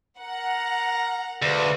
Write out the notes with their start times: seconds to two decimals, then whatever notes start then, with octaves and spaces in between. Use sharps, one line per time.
0.19 A#4 F#5 A#5
1.42 D2 F#4 G#4 B4 D5 F5